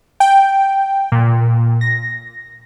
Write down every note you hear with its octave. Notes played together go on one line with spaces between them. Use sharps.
G5
A#2
A#6